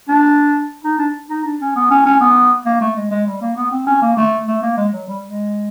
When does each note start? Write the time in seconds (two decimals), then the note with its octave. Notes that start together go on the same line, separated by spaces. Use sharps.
0.08 D4
0.84 D#4
0.99 D4
1.30 D#4
1.44 D4
1.60 C#4
1.75 B3
1.90 C#4
2.05 C#4
2.20 B3
2.65 A#3
2.81 A3
2.96 G#3
3.11 G#3
3.26 G3
3.41 A#3
3.56 B3
3.71 C4
3.86 C#4
4.02 A#3
4.17 A3
4.48 A3
4.62 A#3
4.77 G#3
4.93 F#3
5.08 G3
5.23 G#3